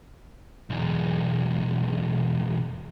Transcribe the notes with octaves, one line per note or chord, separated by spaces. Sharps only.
B1 E2